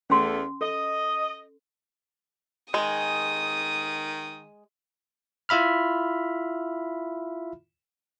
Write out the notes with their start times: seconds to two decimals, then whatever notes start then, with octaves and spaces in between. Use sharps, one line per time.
0.10 E2 A3 C#4 C6
0.61 A4 D#5
2.74 D#3 G#3 D#6
5.49 E4 F4 E5 B5 F6